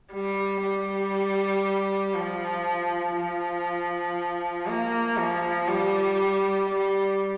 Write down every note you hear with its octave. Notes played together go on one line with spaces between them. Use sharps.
G3
G3
F3
F3
A#3
F3
G3
G3